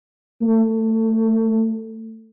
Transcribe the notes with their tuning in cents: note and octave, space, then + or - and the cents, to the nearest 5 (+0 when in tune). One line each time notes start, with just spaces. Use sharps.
A3 +20